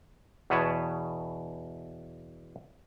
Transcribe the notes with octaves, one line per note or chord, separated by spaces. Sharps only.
E2 B2 B4 C#5 A5